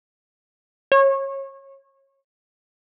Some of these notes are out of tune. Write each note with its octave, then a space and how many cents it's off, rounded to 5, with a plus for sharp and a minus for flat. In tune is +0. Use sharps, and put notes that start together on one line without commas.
C#5 -25